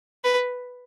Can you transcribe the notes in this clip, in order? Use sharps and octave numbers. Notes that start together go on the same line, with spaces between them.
B4